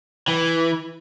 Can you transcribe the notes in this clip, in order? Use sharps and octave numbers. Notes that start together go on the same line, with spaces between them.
E3